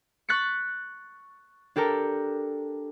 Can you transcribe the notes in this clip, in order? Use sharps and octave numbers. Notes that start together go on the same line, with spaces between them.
C#6 F#6 A6 B6 C#7
D4 G4 A4 A#4